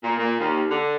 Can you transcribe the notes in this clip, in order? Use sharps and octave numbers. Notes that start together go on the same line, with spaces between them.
A#2
A#2
D#2
D3